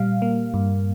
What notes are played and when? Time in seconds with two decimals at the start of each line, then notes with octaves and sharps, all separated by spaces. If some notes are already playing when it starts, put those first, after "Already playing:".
Already playing: A#2 G3 F5
0.22 A#3
0.54 G2